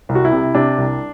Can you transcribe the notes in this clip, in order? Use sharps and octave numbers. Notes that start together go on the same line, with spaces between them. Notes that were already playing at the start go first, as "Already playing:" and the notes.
C2
F#4
E4
C3
C3 D4
C2